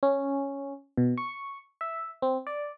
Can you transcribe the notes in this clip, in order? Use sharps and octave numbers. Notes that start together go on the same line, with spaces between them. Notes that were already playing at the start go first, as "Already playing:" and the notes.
C#4
B2
C#6
E5
C4
D5